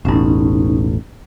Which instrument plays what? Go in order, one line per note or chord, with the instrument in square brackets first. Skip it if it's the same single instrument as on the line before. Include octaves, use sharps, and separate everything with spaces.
[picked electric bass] E1 A1 [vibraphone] C#4 D#4